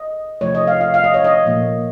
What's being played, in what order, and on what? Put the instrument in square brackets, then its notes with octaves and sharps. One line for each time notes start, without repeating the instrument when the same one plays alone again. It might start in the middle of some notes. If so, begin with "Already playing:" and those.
Already playing: [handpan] D#5
C3 F3 A3 C#5
D#5
F5
F5
F5
D#5
C#5
D#5
A#2 F3 A#3